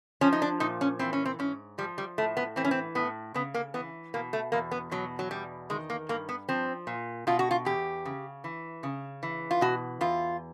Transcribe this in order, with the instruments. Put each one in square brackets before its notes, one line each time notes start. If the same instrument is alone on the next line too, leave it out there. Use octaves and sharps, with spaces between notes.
[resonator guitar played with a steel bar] F3 C#4
D#4
D4
A#2 D#4
C#4
E3 C4
C#4
C4
G#2 C#4
F3 G3
G3
A2 A3
B3
E3 C4
C#4
C4
A2 B3
C#3 B3
A#3
E3 B3
B2 A#3
A3
E2 A#3
B3
B2 F#3
F#3
E2 G3
D#3 G#3
A#3
G2 A#3
B3
F3 C4
A#2
B2 F4
F#4
F4
E2 G4
C#3
E3
C#3
E3
F4
B2 F#4
E2 F4